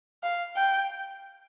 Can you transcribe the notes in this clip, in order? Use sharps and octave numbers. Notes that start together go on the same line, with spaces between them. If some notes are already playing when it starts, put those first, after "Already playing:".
F5
G5